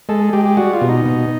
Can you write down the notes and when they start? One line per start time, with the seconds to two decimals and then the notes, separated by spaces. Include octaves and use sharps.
0.09 G#3 A4
0.33 G#3 G4
0.45 G4
0.57 G3 F#4
0.73 F4
0.81 B2
0.89 D#4
1.05 B2